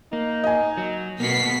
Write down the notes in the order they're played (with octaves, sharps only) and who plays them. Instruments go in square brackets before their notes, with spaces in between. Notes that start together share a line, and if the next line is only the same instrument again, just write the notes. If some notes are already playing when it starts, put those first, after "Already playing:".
[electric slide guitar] A#3 [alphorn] D#4
[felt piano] D#5 G#5
[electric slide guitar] F#3
[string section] B2 B6 C7 [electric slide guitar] A#3 B3 F#4